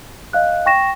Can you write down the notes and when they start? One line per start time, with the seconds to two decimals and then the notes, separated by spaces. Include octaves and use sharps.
0.33 D#5 F5 F#6
0.66 G5 C#6 A#6 E7